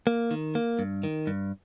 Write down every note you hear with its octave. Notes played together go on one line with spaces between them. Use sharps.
A#3
D#3
A#3
G2
D#3
G2